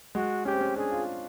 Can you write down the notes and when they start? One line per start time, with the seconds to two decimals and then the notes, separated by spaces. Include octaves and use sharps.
0.15 G#3 F#4
0.45 C#4 G4
0.53 C4
0.61 C#4
0.76 D4 G#4
0.91 F4